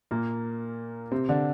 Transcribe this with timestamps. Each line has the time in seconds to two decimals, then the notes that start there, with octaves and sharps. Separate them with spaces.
0.11 A#2 A#3
1.11 C3 C4
1.29 D3 D4